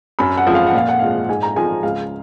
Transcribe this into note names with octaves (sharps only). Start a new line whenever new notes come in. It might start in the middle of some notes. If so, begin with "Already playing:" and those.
F#2 B5
F#5
F3 G#3
F5
F#5
A#2 F5
F#5
F3 G#3 F5
G#2 G#5
A#5
F3 G#3 G#5
C#2 F5